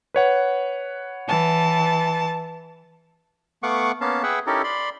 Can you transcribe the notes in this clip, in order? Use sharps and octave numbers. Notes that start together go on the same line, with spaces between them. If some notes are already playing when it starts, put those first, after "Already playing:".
B4 C#5 F#5
E3 A5
A3 B3 F5 F#5 C#6 D6
A#3 B3 C#4 F5 A5
G#4 B4 E5 F#5 G5
C#4 D#4 E4 G4 A4 A#4
D5 B5 C6